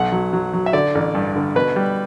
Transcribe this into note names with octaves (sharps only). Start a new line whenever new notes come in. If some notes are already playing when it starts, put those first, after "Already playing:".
Already playing: B1 F#5
F#3
F#3
F#3
E5
D3 D5
A1
G2
D3
B2 B4
G3